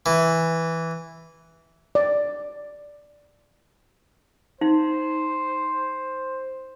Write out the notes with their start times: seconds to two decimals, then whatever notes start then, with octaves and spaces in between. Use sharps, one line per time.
0.06 E3
1.95 D5
4.61 D#4 C5